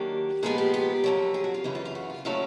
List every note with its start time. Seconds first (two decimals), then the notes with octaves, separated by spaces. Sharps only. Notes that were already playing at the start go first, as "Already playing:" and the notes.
Already playing: D#3 F#3 A#3 D4 G4
0.43 A#2 F3 G#3 B3 G#4
0.58 G4
0.74 G4
1.04 F2 D3 F#3
1.34 G#4
1.44 F#4
1.54 F4
1.64 F#2 C#3 E3 E4
1.75 F4
1.85 F4
1.95 F#4
2.10 F4
2.25 A#2 F#3 A3 C#4 E4 F4